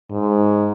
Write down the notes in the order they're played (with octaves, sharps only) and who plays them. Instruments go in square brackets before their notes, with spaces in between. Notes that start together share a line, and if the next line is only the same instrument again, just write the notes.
[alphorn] G#2